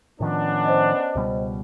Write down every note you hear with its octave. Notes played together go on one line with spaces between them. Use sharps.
A2 D#3 F3 B3 C#4 D4
C5 D#5
C#2 B2 G3